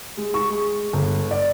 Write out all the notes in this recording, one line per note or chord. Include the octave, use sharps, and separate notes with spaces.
G#3
C#6
G#3
G1
D5